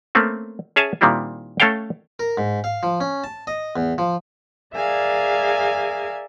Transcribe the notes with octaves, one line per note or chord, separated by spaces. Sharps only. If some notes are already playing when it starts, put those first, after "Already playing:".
A3 A#3 C4 C#4
C#4 G#4 C#5 E5 G#5 A5
A#2 D#3 G3 C4 E4 F4
A3 C#4 A4 C#5 F5 G5
A#4
G#2
F5
F3
C#4
A5
D#5
E2
F3
G#4 A#4 D5 E5 F5 G#5